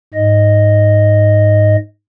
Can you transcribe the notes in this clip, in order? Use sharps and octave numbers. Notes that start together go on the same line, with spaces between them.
G#2 D#5